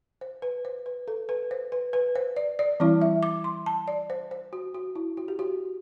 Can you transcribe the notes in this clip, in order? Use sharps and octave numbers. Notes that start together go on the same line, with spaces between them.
C5
B4
C5
B4
A4
B4
C5
B4
B4
C5
D5
D5
E3 G3 C4 E4
E5
D6
C6
A5
D5
C5
C5
F#4
F#4
E4
F#4
G4
F#4